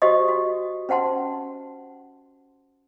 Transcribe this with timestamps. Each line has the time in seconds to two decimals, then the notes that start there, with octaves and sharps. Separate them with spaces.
0.02 F#4 G4 C5 D#5 C#6 D#6
0.28 F#4
0.89 C#4 C5 F#5 A5 C6